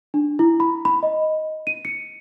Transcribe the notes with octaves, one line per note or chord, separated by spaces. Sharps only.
D4
E4
B5
B5
D#5
D#7
C#7